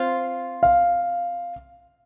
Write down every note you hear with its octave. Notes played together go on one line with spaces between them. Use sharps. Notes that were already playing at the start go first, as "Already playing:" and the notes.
Already playing: C4 F4 C6
F5